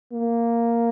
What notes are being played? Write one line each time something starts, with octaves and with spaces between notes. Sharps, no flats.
A#3